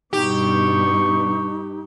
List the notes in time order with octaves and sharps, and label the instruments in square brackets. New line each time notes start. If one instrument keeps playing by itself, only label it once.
[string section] G2 B2 [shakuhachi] D#4 [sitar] G4 [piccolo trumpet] C#6